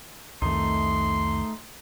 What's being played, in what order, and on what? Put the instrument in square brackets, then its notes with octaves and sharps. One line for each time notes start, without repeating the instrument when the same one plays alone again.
[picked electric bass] C2 F2 D#3 [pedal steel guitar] A3 D#4 [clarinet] C6